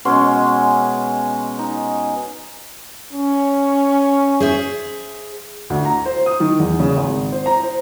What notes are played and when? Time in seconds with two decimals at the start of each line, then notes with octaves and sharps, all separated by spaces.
0.05 B2 G#3 C#4 C6
1.59 D#4
3.13 C#4
4.40 G#4 C5 E5
5.70 D2
5.85 A#5
6.06 C5
6.26 D#6
6.40 D#3
6.59 E2
6.80 C#3
6.97 G#1
7.32 C5
7.46 A#5
7.63 C5